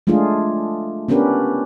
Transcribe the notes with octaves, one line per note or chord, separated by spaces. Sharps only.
G#3 A3 D4 F4 G#4
B3 C#4 D4 G4 A#4 B4